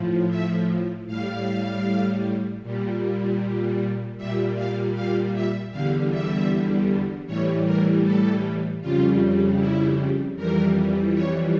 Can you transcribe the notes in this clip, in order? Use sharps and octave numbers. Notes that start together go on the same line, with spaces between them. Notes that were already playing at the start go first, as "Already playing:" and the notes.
Already playing: A2 F3
E5
A2 G3 F5
A#2 G3
A#2 G3 E5
F5
F5
E5
E2 D3 G3 F5
E5
A2 E3 G3 C#5
A#4
A4
F2 C#3 G3 F4
E4
F2 E3 G3 A#4
C#5